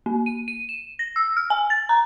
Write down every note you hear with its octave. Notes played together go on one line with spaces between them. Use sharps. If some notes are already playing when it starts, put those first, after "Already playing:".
A#3
D#7
D#7
E7
A#6
E6
F6
G#5
A6
A#5